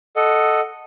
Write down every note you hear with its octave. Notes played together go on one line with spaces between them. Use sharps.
A4 D#5 F#5